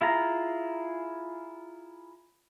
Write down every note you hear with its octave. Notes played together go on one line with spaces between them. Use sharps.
E4 F4 G#4 A#5